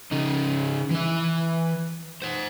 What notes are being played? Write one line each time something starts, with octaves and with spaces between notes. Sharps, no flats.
C#3 D#4
E3 E5
C5 F#5